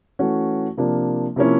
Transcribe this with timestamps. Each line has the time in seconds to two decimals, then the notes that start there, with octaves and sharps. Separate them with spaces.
0.19 E3 A3 C#4 F#4
0.77 C3 F3 A#3 D4
1.36 C3 F3 A#3 C#4 E4